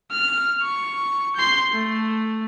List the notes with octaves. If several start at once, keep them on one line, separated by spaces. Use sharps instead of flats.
F6
C#6
C6 G6
A3